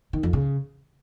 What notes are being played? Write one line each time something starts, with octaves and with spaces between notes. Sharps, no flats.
D#3
F2
C#3